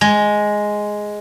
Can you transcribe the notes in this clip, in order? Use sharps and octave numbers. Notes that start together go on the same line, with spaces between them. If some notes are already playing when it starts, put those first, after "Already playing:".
G#3